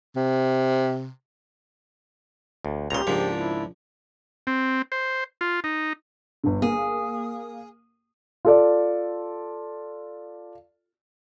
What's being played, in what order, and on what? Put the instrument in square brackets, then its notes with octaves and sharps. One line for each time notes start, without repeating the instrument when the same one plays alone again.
[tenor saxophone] C3
[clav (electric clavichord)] D2
[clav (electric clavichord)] C#2 A#2 C#3 [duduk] G4 [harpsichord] A#5 C6
[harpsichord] C#2 F3 A#3 [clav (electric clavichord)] G#2 [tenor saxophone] D4
[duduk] E4
[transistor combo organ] C4
C5
F4
D#4
[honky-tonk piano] G1 D3
[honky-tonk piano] A#3 [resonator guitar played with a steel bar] G#4
[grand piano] F4 A4 D5